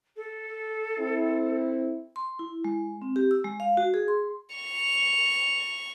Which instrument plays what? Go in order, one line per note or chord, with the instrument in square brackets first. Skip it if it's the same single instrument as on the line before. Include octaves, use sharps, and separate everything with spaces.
[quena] A4
[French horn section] C4 E4
[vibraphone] C6
E4
G#3
C4
G4
E6
G#3
F5
F#4
G#4
C6
[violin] C#6 F7